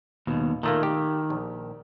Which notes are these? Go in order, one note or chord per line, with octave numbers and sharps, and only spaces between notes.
D#2 B2
A#2 D#3 A3 A#3
G4
A#1